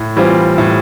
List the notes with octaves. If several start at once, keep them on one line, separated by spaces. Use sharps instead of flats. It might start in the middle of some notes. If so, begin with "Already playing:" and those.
Already playing: A2
E3 G3 C4 F4
A2